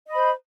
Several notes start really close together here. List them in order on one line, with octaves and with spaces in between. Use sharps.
D#5 B5 C5